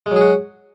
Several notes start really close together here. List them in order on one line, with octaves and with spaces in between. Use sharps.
G#3 F#3 G#4 F#4